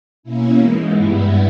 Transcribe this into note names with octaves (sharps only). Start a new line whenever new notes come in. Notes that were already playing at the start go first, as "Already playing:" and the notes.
B2 A#3 C#4 E4
G#2 E3 G#3
G2 G3 B3 E4